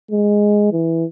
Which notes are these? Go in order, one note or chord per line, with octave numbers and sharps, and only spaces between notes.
G#3
E3